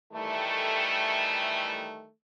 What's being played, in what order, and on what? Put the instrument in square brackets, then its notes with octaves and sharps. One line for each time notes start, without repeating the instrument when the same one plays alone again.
[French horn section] D#3 E3 G3 A3